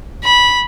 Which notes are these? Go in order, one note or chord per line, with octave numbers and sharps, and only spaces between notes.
B5